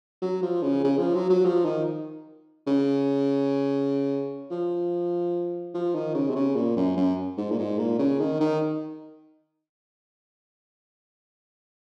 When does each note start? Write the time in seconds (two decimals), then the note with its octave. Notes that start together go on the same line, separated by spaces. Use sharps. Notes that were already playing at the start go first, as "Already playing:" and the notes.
0.22 F#3
0.42 F3
0.62 C#3
0.84 C#3
0.98 F3
1.14 F#3
1.29 F#3
1.45 F3
1.65 D#3
2.67 C#3
4.51 F3
5.74 F3
5.95 D#3
6.14 C#3
6.30 C3
6.35 C#3
6.55 A#2
6.76 F#2
6.96 F#2
7.37 G#2
7.51 A#2
7.58 G#2
7.78 A#2
7.99 C#3
8.20 D#3
8.40 D#3